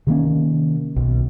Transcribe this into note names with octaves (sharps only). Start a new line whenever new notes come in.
C3 D#3 A#3 C#4
B1